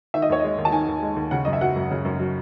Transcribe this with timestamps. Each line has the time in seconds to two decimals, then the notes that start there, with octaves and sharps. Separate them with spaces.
0.14 D#3 E5
0.22 D#5
0.29 D#2 C#5
0.40 G#3 D#5
0.58 D#2
0.65 A5
0.72 D#3 G#5
0.88 D#2
1.02 G#3
1.16 D#2
1.31 C#3 F#5
1.45 F#2 D#5
1.53 E5
1.61 F#3 F#5
1.76 F#2
1.91 C#3
2.05 F#2
2.19 F#3